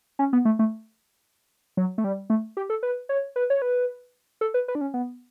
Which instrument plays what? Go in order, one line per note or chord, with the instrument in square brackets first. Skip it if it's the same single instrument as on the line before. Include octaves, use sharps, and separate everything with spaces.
[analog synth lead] C#4
B3
A3
A3
F#3
A3
G3
A3
G4
A4
B4
C#5
B4
C#5
B4
A4
B4
B4
D4
C#4
B3